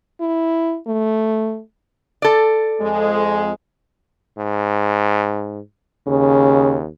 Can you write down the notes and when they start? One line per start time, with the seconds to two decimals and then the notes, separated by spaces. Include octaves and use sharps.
0.20 E4
0.86 A3
2.22 A4 D5
2.80 F2 G#3
4.38 G#2
6.07 D#2 C#3